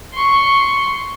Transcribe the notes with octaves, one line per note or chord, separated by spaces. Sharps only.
C6 C#6